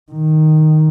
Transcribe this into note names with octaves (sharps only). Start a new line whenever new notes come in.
D#3